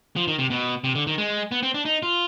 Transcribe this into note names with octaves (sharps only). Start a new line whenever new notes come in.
F3
D#3
C3
B2
C3
D3
D#3
G#3
B3
C4
D4
D#4
F4